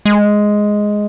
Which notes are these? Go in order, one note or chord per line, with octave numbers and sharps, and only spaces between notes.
G#3